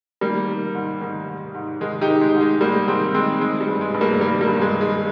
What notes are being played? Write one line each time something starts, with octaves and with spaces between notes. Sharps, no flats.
D#3 G3 A#3
D#3
G#2
D#3
G#2
G#2
D#3 G#3
D#4 G4
D#3
G#3
G#2
G#3
G#2 G3 A#3
D#3 G#3 C4
D#3 G#3 C4
D#3 G#3
G3
G2
G#3
G2
G3 A#3
D#3 G3 A#3
G3 A#3
G2
G3
G#3
D#3
G#3